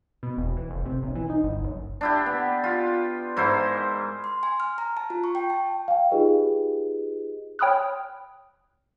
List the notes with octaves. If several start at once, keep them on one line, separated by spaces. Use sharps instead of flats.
B2
E1
E3
F1
C3
B1
E3
D#4
G1
F#1
D4 E4 G4
B3
F4
G#2 E4 A#4 C5
C6
G#5
F6
A#5
A5
F4
C#6
G5
A5
F5 G5
D#4 F4 G4 G#4 B4 D#5
C#5 G5 B5 D#6 F6 F#6